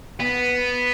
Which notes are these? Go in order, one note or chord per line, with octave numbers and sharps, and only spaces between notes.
B3